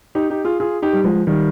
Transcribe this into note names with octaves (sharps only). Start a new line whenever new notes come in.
D#4 G4
D#4 G4
F4 G#4
F4 G#4
D#4 G4
G3
F3 G#3
D#3 G3